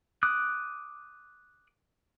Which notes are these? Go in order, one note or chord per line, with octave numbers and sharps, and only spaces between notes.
D6 D#6 F#6